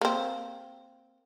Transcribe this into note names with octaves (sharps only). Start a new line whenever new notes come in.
A#3 C4